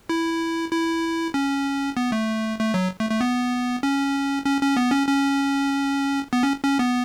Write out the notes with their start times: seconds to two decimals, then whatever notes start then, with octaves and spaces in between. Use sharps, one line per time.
0.09 E4
0.72 E4
1.34 C#4
1.97 B3
2.12 A3
2.59 A3
2.74 F#3
3.00 A3
3.10 A3
3.21 B3
3.83 C#4
4.46 C#4
4.61 C#4
4.77 B3
4.92 C#4
5.08 C#4
6.33 B3
6.43 C#4
6.64 C#4
6.79 B3